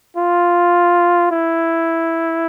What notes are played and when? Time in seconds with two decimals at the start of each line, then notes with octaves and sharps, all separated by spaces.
0.17 F4
1.31 E4